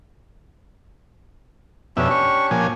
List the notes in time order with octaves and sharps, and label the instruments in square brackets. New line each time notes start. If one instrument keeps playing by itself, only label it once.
[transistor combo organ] F2 B2 E5 [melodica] C#4 D4 G4
[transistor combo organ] C#6
A#2 F3 G#5